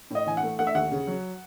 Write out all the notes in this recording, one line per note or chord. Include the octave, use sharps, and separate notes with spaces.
A2 D#5
E3 G#5
F#5
A3
A3 F#5
E5
D#2 F#5
C#3
F#3